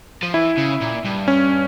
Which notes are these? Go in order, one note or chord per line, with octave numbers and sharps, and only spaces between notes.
F3
E3 E4
C#3
A#2
G2
C#4